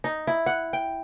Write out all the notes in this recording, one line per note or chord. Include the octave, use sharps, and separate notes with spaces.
D#4
E4
F#5
G5